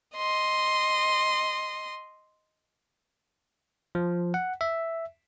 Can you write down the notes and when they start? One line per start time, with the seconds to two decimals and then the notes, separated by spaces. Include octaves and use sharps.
0.17 D#5 C6
3.95 F3
4.34 F#5
4.61 E5